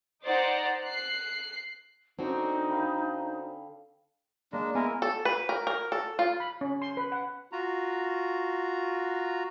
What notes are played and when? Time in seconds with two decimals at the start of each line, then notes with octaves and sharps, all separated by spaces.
0.23 D#4 C5 D5 F#5 A#5
0.85 F#6 C7
2.19 D3 C4 C#4 D#4 F#4 A4
2.69 F5 G5 B5
4.53 G#3 A#3 D4
4.75 G#3 B3 E4 A#4 G#5 D7
5.02 A4
5.25 B4
5.49 A#4
5.67 A#4
5.92 A4
6.19 F4
6.40 B5
6.61 C#4
6.82 C6
6.97 B4
7.12 F#5
7.52 F4 F#4 A#5